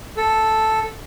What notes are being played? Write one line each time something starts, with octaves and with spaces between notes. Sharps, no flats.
A4